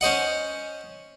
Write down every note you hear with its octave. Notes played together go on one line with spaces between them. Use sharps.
C#4 C5 D#5 F#5